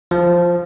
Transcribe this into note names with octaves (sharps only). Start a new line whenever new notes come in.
F3